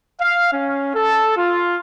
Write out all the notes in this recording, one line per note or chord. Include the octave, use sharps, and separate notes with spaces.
F5
C#4
A4
F4